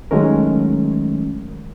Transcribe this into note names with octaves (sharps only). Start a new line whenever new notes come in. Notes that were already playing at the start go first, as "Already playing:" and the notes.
D#3 F#3 G#3 A3 C#4 A#4